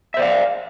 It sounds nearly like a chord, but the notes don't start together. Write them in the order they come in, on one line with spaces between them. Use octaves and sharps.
E5 C5 D5 F5